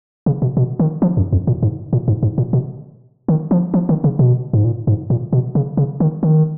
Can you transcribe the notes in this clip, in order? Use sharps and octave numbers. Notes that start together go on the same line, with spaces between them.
C#3
B2
B2
D#3
F3
F#2
F2
A#2
G#2
A#2
G#2
G#2
A#2
B2
D#3
F3
F3
D#3
C#3
B2
G#2
A#2
G#2
A#2
B2
C#3
C#3
D#3
D#3